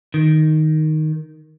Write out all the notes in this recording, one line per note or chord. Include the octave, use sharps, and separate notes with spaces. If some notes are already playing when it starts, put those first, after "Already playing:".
D#3